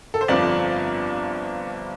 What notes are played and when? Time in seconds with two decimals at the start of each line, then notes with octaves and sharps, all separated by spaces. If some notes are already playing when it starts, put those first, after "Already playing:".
0.14 A4
0.21 C5
0.28 G1 F2 F3 D5